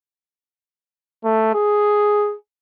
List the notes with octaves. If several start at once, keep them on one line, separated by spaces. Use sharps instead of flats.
A3
G#4